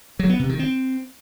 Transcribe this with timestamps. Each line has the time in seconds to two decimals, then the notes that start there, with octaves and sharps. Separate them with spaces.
0.19 F#3
0.29 B3
0.39 C3
0.49 D#3
0.59 C4